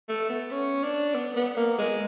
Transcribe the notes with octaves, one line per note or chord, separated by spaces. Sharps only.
A3
B3
C#4
D4
B3
B3
A#3
G#3